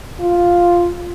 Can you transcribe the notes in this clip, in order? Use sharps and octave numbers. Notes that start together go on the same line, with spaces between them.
F4